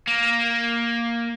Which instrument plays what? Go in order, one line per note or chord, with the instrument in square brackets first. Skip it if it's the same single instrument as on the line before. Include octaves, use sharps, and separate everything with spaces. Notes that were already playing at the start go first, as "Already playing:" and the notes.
[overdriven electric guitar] A#3